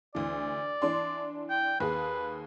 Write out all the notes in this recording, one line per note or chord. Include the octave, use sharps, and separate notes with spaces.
D2 E3 D5
E3 D4 C6
G5
D#2 G#4 B4